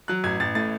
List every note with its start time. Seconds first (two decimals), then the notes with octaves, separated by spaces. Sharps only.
0.08 F#3 F#6
0.24 A1 G#6
0.40 A1 A6
0.55 A2 A6